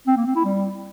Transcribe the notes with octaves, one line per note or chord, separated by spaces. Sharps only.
C4
A#3
C4
E4
G3